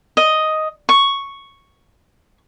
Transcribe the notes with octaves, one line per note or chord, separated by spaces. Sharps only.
D#5
C#6